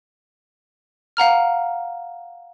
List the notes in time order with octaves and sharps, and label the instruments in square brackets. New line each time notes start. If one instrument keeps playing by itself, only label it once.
[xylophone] F5 F#5 A#5 F6